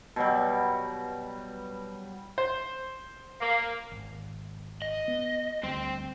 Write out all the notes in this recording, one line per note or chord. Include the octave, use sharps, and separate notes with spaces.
B2 F#3 G3
C5
A#3
G#1
D#5
B3
D2 G3 C4 C5